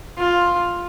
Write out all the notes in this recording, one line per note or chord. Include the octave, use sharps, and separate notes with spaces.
F4